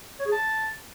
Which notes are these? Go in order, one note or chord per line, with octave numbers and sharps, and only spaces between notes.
C#5
G#4
A5